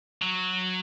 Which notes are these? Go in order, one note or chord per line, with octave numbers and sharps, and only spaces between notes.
F#3